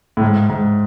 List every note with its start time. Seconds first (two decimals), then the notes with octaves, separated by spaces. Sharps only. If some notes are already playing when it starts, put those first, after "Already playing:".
0.17 A2
0.21 G#2
0.50 G#2